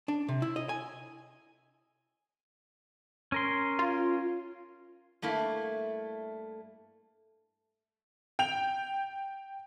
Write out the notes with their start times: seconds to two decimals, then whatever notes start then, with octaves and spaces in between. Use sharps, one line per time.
0.08 D4
0.28 C3
0.42 E4
0.56 D#5
0.69 G#5
3.32 C#4 A#4 C6
3.79 F4
5.22 G2 A3 A#3 E4
8.39 G5 G6 F7